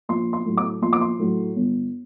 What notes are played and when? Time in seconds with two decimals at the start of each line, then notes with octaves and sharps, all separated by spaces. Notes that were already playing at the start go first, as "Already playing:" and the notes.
0.09 A#1 C6
0.33 C6
0.46 A2 F#3
0.57 D6
0.82 A#1 C6
0.93 D6
1.01 C6
1.19 A2 F#3
1.56 G1